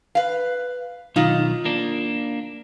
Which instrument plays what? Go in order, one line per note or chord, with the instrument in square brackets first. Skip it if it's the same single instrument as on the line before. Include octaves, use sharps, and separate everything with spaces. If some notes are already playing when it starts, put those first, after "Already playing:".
[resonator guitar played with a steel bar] B4 F5
[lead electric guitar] B1 D#3 [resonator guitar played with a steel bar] D#4 F4
[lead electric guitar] A#3 D4